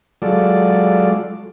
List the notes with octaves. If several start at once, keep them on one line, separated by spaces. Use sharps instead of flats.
F#3 G#3 F4 A4 D5